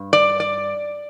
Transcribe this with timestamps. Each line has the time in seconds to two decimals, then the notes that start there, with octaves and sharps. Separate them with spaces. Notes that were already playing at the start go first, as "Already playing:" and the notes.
Already playing: G2
0.13 D5
0.40 D5